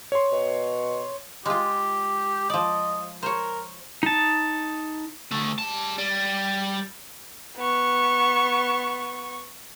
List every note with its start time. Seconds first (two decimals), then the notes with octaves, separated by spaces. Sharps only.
0.12 C#5 C6
0.32 B2
1.46 G#3 F4 G4
2.50 F3 D5 D#5
3.23 A#4 C5 C#5
4.03 D#4 A5
5.31 D2 A3
5.58 G3 A5
5.98 G3
7.57 B3 C#6